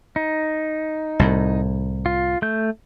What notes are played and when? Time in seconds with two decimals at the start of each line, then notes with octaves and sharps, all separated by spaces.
0.16 D#4
1.19 C2 A2
2.06 F4
2.42 A3 G6